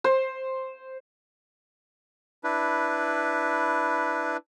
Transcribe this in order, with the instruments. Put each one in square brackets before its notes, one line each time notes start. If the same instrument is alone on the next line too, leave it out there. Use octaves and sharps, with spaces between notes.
[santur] C5
[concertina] D4 E4 B4